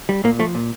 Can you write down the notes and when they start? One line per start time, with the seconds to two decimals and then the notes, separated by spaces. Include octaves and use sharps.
0.09 G3
0.24 A#2 A#3
0.39 F3 A3
0.55 A#2